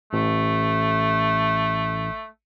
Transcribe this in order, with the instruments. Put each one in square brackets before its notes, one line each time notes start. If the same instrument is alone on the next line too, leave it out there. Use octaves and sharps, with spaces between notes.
[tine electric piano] A1 [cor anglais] A3